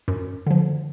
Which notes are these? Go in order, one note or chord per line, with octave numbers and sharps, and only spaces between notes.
F#2
D3 F3